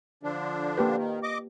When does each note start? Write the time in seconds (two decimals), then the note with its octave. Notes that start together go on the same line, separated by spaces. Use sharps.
0.23 D3 F3 D4
0.77 A#3 G4 B4
0.96 D#3
1.23 D#5 D6